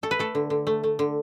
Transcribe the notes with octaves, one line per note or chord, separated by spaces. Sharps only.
A3 A4
B4
A3 A4
D3
D3
A3
A3
D3